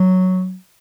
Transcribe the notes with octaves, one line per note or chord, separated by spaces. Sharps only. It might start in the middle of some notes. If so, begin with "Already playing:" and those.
Already playing: F#3